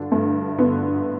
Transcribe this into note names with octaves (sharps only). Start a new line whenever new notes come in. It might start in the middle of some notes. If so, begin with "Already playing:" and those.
Already playing: G2 D3 D4
G2 A3
D3 B3